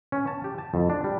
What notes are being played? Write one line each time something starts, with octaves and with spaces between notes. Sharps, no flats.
C#4
A5
G4
A5
F2
D4
G3